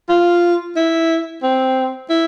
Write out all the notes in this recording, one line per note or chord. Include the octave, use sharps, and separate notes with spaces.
F4
E4
C4
E4